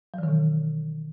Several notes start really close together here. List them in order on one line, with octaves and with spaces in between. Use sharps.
F#3 E3 D#3 B2